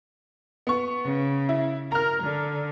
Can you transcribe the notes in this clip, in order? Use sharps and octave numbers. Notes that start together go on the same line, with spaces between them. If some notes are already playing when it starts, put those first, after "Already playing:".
B3 C#6
C#3
E4
A#4 A#5 F6
D3